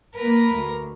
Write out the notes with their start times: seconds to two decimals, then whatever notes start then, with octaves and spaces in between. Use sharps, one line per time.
0.15 A#3 A#4 B4 A#5
0.53 D2